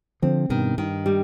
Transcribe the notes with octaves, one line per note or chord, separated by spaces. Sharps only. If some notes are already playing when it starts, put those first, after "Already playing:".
D3 F3 C4
G2 B2 D#3
G2 D#3
G3